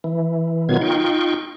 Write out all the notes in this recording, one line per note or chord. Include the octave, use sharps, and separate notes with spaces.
E3
B2 D#3 F#3 B3 F4 G#6
D#4 F4 G5 C#6